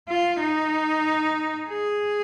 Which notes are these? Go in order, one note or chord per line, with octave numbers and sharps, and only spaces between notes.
F4
D#4
G#4